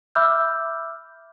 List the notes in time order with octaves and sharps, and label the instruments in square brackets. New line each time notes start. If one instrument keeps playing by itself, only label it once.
[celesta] E5 B5 D6 E6 F6 G6